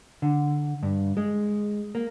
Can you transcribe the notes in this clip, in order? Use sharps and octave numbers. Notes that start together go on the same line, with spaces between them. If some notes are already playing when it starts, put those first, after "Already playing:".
D3
G2
G#3
A#3